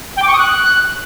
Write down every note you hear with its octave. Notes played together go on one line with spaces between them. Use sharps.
G5
D6
C#6
D#6
F#6